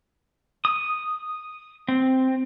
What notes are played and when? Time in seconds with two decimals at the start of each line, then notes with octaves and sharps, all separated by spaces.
0.65 D#6
1.88 C4